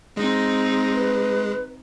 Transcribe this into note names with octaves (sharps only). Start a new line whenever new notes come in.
G#3 C4 D#4
B4